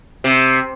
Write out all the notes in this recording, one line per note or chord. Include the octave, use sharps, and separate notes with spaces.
C3